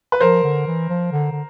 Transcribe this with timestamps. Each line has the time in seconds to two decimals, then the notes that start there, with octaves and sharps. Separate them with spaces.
0.12 B4
0.21 F3 A#4 C5
0.44 D3
0.67 E3
0.90 F3
1.12 D3
1.31 D3